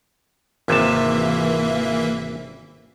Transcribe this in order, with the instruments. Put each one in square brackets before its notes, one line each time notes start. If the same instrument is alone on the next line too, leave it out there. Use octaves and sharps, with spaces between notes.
[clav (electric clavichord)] G#1 C3 A5 [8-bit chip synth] E3 A#3 E5